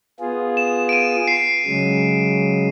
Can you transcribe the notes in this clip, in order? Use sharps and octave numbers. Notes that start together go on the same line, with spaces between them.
B3 F4 G#4
E7
D7 D#7
C7
C#3 F#3 G#3